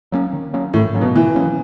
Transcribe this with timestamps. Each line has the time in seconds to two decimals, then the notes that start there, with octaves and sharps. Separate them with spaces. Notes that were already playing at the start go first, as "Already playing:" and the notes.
0.12 F#3 A#3 C#4
0.33 D#3
0.53 F#3 A#3 C#4
0.73 A2 D#3
0.94 F#3 A#3 C#4
1.01 B2
1.15 D#3 E3
1.36 F#3 A#3 C#4